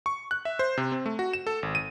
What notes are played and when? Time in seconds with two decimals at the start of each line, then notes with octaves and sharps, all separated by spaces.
0.06 C#6
0.31 F#6
0.45 E5
0.59 C5
0.77 C3
0.92 C4
1.06 A3
1.19 F#4
1.33 E7
1.47 A4
1.63 G#1
1.75 D#7